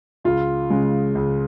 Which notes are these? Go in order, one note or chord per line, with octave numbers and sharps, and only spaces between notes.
C#2 F4
C#3 G#3
C#2